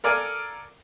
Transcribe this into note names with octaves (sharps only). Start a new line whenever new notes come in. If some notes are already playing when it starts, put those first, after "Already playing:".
A4 A#4 D5 F5 G#5